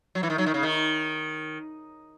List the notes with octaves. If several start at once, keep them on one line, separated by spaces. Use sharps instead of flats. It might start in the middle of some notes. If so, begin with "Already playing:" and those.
F#3
E3
D#3
F#3
D#3
C#3
D#3